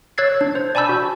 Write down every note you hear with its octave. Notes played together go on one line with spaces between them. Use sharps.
C#5 E6 F#6 G#6 A6 C7
D4
C5
D5 G#5 A5 B5 E6 G6
F#4